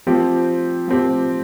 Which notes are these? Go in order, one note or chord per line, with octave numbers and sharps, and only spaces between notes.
F3 C4 G4
F3 C4 G4